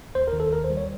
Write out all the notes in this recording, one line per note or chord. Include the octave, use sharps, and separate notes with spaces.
D#2 C5
A#4
D#3
A4
D#2 A#4
C5
G3
C#5